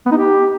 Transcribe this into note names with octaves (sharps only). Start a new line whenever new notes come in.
B3
D#4
G4